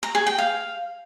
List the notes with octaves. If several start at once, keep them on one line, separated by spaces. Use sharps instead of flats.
A#5
G#4
G5
F5